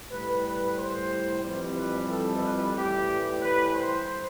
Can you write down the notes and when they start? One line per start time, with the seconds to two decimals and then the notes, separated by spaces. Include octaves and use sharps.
0.11 A2 G3 B4
0.45 B4
0.77 C5
1.43 F2 E3 G3
1.76 B4
2.10 A4
2.43 B4
2.75 A2 E3 G3 G4
3.42 B4
3.74 C5